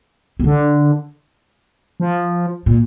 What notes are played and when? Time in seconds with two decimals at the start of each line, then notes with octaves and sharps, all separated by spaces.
0.39 C4
0.44 D3 D4
2.00 F3
2.66 A#2